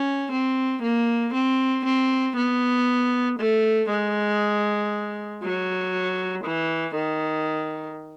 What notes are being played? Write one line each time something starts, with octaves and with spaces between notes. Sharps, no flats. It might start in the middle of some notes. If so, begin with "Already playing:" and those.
Already playing: C#4
C4
A#3
C4
C4
B3
A3
G#3
F#3
E3
D#3